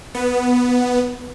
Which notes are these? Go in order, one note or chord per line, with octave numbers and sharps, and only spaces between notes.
B3